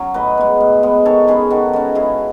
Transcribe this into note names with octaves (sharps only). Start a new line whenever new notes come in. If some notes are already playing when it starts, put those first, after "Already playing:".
Already playing: F#3 C#4 C#5
A2 B4 D#5
G#3 B3
A2
G#3 B3
D#3 A4 C#5
G#3 C#4 G#4 B4
D#3 F#4 A4
G#3 C#4 F#4 A4
C#3 E4 G#4